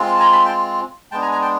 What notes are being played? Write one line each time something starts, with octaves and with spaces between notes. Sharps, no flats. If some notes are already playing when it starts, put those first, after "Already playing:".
Already playing: G#3 C4 F4
A5
G#5 A#5
A5 B5
G5 A5
G#3 B3 D4 G5 A5
G#5 A#5
G#5 A#5
G5 A5